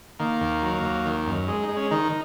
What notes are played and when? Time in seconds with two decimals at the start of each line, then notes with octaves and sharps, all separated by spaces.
0.19 D#3 A#3
0.41 D#2
0.62 F#3
0.83 D#2
1.06 D#3
1.26 F#2
1.48 G#3
1.63 D#4
1.69 G#3
1.77 C#4
1.91 D#3 D#4